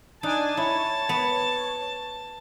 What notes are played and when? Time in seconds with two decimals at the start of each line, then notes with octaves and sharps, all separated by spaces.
0.23 D4 D#4 G#5 A5
0.57 E4 C#5
1.09 B3